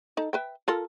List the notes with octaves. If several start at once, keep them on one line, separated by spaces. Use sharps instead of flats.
D#4 A4
B4 E5 G5
F4 A4 A#4